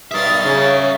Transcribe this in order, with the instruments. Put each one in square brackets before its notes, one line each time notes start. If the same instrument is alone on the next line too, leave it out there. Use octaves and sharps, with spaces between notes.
[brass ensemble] B1 G2 [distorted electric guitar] A#4 E5 [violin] F5 A6 [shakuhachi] D#6
[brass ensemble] C#3 [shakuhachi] C#5